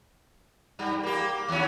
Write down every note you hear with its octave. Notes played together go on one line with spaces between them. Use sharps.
G2 G3
A#3 G4
D#2 C#4